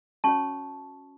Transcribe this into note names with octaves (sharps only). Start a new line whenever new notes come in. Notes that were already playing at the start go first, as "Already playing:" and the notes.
C#4 F#4 C#5 A5 C#6